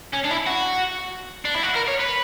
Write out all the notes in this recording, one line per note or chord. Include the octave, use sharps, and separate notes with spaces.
C#4
D4
E4
F#4
D4
E4
F#4
A#4
C#5
B4